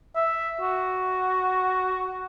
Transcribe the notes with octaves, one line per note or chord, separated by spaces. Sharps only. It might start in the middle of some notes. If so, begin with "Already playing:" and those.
E5
F#4